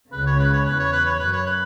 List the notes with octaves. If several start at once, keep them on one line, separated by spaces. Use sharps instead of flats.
C#2 C#3 B4
C#5
B4
C#5
E2 B4
C#5
B4
C#5
F#2 B4
C#5
B4